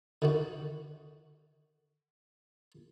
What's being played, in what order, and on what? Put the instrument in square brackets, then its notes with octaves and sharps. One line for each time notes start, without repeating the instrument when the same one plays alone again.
[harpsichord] D3 D#3 F#4